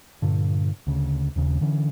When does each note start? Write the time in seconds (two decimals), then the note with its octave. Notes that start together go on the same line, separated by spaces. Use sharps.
0.22 G2 A#2 D3
0.87 D2 C#3
1.36 D#1 D#2 C#3
1.61 D3 E3 C#4